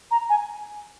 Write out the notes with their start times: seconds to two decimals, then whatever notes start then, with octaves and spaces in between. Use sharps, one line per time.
0.11 A#5
0.30 G#5